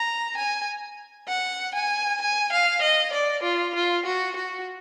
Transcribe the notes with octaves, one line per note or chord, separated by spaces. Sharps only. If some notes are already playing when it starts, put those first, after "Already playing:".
Already playing: A#5
G#5
F#5
G#5
G#5
F5
D#5
D5
F4
F4
F#4
F#4